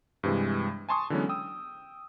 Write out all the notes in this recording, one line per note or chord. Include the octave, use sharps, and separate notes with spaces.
G2 C3 E3 G#3
G#5 A5 C6 C#6 D#6
D3 E3 F#3 G#3 B3 C#4
G5 D#6 E6